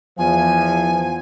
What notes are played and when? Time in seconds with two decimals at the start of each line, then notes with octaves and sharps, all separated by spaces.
0.18 E2 F3 G#5